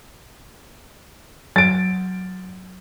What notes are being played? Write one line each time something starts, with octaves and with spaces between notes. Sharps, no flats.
F#3 A6 D7